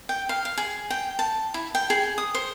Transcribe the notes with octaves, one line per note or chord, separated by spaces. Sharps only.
G5
F5
F5
G#4
G5
A5
E4
G5
G#4
D#6
C5